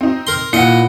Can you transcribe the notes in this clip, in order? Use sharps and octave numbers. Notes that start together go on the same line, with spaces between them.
C4 D#4
A#4 C6
A#2 E4 D#5 F#5 C#7